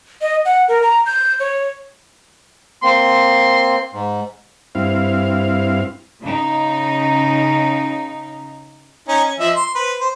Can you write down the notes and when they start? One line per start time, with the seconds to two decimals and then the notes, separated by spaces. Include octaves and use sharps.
0.21 D#5
0.45 F#5
0.68 A#4
0.82 A#5
1.06 G6
1.40 C#5
2.83 A#3 C4 C6
3.93 G#2
4.75 G2 C4 E4 F5
6.23 C#3 D#4
9.08 C#4 D#4 A#5
9.24 C#4
9.39 F3 D#5 E5
9.56 C6
9.75 B4 C5
10.00 C5